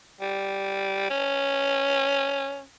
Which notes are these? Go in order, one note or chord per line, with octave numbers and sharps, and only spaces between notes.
G3
C#4